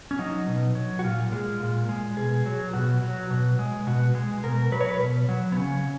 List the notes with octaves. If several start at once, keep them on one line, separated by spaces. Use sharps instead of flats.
C#4
F#3 D#4
B2
F#3
F#4
A#2 F4
G#3
A#2
G#3
B2 G#4
F#3
B2 F#4
F#3
B2
G#3
B2 F#4
G#3
B2 A#4
F#3 B4
C#5
B4
B2
F#3
B3
C#3 C#4